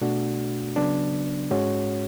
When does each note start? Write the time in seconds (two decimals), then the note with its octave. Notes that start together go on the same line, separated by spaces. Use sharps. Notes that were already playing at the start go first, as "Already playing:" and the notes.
0.01 B2 A3 D4 F#4
0.76 C#3 F#3 B3 D4
1.51 G#2 G#3 C#4 F#4 C#5